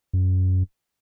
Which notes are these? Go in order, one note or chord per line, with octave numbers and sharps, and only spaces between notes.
F#2